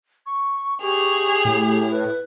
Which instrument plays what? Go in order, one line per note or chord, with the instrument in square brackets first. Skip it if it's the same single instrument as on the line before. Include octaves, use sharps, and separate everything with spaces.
[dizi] C#6
[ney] G4 [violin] G#4 F7 [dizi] C#6
[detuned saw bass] A2 [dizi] E4
[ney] B4